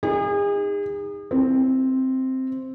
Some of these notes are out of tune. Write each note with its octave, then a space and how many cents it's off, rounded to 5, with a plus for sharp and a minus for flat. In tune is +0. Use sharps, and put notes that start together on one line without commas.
D#4 +0 G#4 -40
C4 +0 E4 +0